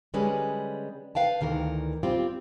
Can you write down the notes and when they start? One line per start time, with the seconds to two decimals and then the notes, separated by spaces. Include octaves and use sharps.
0.14 D3 G3 G#3 C#4 B4
1.15 B4 F5 G5 A5
1.41 D2 D#3 E3 A#4
2.03 G3 C4 F4 G4